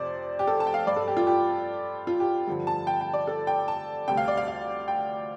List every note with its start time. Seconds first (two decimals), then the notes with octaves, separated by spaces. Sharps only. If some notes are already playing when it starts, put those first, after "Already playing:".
Already playing: F2 C3 C5 D5
0.39 G4
0.47 A4
0.60 A5
0.67 G5
0.74 F5
0.86 G2 G3 D5
0.96 A4
1.08 G4
1.17 F4
1.27 G4
2.07 F4
2.20 G4
2.47 G2 D3 F3
2.67 A5
2.87 G5
3.01 G5
3.14 D5
3.27 A4
3.47 G5
3.68 A5
4.08 D2 C3 G3 G5
4.17 F5
4.28 D5
4.37 F5
4.48 F5
4.88 G5